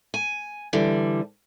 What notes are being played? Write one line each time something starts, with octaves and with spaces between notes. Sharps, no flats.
G#5
D3 E3 G3